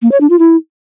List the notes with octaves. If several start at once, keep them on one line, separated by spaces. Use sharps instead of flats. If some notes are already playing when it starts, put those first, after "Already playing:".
A#3
C#5
D4
F4
E4